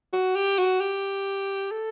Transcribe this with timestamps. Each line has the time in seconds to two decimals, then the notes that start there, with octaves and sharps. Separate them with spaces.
0.13 F#4
0.36 G4
0.58 F#4
0.81 G4
1.71 A4